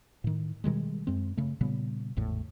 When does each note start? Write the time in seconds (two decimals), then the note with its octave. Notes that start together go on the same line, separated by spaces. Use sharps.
0.24 A2 D#3
0.64 B2 D#3 G3 G#3
1.07 F#2 G#3 C4
1.37 C#3 A3
1.61 A#2 C#3 G3 B3
2.17 G#1 E2 A2